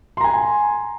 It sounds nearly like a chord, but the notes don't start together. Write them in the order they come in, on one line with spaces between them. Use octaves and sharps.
C6 A#5 G#5